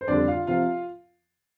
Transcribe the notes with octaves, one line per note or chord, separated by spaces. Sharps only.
C5
F2 D3 G3 D4 D5
F4 F5
C3 F3 C4 F4 F5